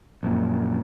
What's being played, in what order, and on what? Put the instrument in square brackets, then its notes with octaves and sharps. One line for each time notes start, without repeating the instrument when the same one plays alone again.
[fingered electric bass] A#1 F#2 A#2